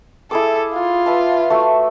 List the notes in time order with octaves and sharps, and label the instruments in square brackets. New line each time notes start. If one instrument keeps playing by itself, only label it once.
[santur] E4 G#4 D6 [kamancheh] A4
[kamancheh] F4
[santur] B4 E5 A5
A3 F#4 E5